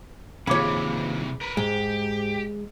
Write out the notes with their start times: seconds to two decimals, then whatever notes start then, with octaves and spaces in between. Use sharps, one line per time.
0.47 D#2 C3 E3 F3 G#4 C#5 B5 D6
1.41 A#4 B4
1.57 G#2 G#3 G4